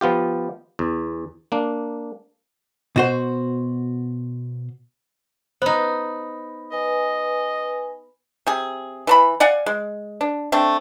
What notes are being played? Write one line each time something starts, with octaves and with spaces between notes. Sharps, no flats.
F3 B3 F4 G4
E2
A#3 D4
B2 F#4 C5
B3 D#4 C5
B4 D#5 G#5
C3 G#4
E3 A5 B5
D5 F5 F#5 G#5
G#3
D4
A3 C4 D4